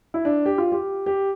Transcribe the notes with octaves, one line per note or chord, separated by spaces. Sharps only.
E4
D4
G4
F4
G4
G4